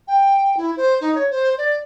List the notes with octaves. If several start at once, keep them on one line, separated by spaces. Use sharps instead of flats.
G5
E4
C5
D#4
C#5
C5
D5